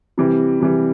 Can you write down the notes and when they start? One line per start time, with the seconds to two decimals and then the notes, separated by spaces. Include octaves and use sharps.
0.18 C3 E3 G3
0.60 C3 E3 G3